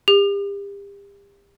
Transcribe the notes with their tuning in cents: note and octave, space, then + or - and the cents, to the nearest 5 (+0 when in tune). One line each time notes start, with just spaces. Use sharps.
G4 +35